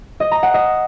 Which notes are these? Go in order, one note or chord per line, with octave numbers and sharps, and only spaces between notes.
D#5
A#5
F#5
D#5